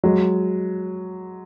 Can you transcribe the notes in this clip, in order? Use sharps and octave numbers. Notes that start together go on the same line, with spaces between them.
F#3 G#3